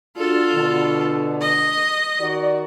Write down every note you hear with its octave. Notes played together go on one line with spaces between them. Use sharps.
D4 F4 F#4 A4
B2 D3
D#5
D#3 F#4 D5